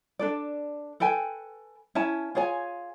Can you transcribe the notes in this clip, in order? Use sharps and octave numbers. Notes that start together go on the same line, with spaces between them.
D4 A4 D5
A4 B4 G5 G#5
C#4 E4 G#5 A5
F4 G#4 C#5 G#5